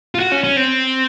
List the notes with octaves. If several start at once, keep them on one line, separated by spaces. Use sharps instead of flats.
F4
F#4
C#4
C#4
C4